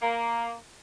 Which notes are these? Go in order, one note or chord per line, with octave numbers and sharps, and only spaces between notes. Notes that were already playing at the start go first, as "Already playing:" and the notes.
A#3